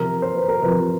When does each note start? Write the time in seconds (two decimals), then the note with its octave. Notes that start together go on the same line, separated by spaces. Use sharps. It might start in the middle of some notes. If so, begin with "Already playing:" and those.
Already playing: C3 F3 A#4
0.22 C5
0.35 B4
0.48 A#4
0.62 C3 F3 B4